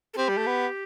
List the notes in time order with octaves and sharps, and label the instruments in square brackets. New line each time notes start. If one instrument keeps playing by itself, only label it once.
[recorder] A4
[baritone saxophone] C4 [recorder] G4
[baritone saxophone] G3
A3
B3